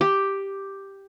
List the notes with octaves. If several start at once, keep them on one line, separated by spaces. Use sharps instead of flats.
G4